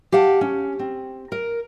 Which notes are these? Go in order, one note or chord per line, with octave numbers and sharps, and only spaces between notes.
G4 F5 F#5 A5
C#4
C4
A#4